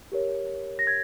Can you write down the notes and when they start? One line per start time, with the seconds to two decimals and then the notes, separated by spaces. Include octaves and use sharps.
0.12 G4 A#4 C#5
0.79 A#6
0.87 G#6